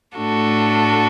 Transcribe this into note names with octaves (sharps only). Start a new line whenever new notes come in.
A2 A3 D4 F#4 A4